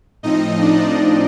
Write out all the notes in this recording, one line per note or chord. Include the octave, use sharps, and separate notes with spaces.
A2 F3 C4 D#4 D#5
D4 D5